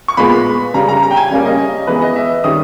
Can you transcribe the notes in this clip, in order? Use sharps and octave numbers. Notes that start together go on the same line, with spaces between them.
C#6
A#2 G#3 B3 B5
C#3 G3 C#4 A#5
A#5
A#5
G5
G#5
C#3 G3 A#3 C#4
D#5
E3 G#3 B3 B4
D#5
E5
D#3 G3 C#4 D#6